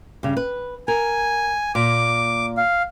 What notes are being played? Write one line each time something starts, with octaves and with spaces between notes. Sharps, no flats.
G2 C#3
B4
A#4 G#5
A#2 D6
F5